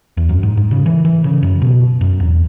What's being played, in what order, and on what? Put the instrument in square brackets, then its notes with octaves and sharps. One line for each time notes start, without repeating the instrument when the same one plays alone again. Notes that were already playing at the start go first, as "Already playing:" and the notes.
[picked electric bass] E2
F#2
G#2
G#2
C#3
E3
E3
C#3
F#2
B2
F#2
E2